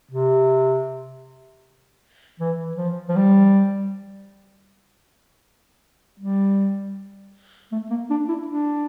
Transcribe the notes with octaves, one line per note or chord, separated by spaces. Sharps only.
C3
E3
F3
F3
G3
G3
A3
A#3
D4
E4
D4